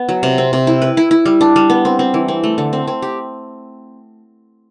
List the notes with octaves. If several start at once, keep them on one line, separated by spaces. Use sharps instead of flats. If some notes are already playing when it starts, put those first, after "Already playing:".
Already playing: B3
F#3
C3
C4
C3
E4
B4
E4
E4
G3
D4
G3
B3
C4
C4
E3
C4
A3
D3
C4
C4
G4